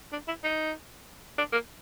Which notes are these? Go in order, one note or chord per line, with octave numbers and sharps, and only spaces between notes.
D4
E4
D#4
D4
A#3